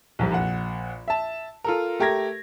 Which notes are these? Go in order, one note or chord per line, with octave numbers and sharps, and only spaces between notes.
C2 F2 C3
A#1 F#5
E5 A5
F4 A4 A#4
A3 G4 A#4 G#6 A#6